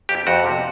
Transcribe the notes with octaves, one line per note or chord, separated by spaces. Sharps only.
F2 G4
F2 F#4
C3